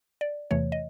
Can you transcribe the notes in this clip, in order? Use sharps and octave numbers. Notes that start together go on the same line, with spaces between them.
D5
E2 C3 E3 A3 C#5
D#5